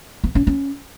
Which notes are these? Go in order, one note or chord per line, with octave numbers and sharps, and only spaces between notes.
B3
C#4
C#4